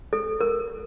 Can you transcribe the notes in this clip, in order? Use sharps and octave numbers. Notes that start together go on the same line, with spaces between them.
A4
A#4